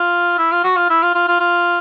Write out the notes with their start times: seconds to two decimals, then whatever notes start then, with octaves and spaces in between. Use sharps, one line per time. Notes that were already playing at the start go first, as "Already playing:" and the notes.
Already playing: F4
0.38 E4
0.52 F4
0.64 F#4
0.76 F4
0.90 E4
1.03 F4
1.15 F4
1.28 F4
1.40 F4